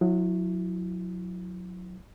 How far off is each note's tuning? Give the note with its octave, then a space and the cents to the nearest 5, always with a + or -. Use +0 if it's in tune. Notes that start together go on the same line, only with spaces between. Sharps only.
F#3 -30 E4 +0